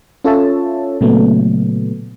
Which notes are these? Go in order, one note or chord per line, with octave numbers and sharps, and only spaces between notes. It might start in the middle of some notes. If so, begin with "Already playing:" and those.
C#4 F4 A4 C#5 E5 A5
A#2 C#3 F#3 A3 B3